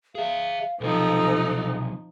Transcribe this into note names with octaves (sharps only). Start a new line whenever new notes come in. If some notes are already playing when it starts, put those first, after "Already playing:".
G#4 E5 F5
B1 C3 F3 D#4 A4